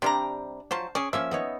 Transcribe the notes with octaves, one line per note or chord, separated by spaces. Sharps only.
C3 G3 D4 G4 A#5
F3 F#3 C5 A5
C#4 G#4 D5
F3 A#3 C#4 E5
B3 D#4 C#5